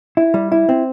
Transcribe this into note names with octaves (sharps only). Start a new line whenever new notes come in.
E4
G3
E4
C4